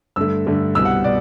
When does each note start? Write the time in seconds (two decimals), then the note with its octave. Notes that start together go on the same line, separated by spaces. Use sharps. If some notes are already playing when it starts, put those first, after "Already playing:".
0.16 G2 D3 A3 E6
0.46 G2 D3 A3
0.75 C2 B2 G3 E6
0.85 F#5
1.04 B2 D5